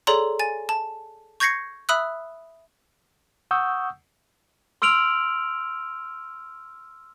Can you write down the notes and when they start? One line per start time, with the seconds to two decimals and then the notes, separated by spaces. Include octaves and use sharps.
0.07 G#4 A4 C#5 D5 A#5 C6
0.39 G#5 A6
0.69 A5
1.40 C#6 G6 G#6 A#6 C7 C#7
1.89 E5 B5 D#6 E6 F#6
3.51 F#5 C#6 D#6 E6 G6
4.82 C6 E6 F6 D7 F7 F#7